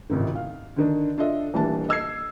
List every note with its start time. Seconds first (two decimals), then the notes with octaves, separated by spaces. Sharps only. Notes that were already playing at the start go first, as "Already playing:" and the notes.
0.10 G#1 C#2 A2 C3 D#3
0.35 F5
0.76 D3 D#3 D4
1.18 D4 F4 A4 D#5 E5
1.54 D#1 E3 G3 D4 A5
1.89 D#5 E6 G#6 C7